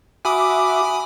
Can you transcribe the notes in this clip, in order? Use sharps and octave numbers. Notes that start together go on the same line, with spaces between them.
F#4 E5 G#5 B5 D6 D#6